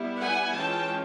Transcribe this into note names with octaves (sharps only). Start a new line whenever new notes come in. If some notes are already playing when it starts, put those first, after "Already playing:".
Already playing: G3 B3 E4
F#5 G#5
E3 G#3 C#4 F4 G5 A5